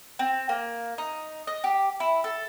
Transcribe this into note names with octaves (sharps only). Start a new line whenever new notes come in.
C4
A#3
D#4
D#5
G4
E4
A4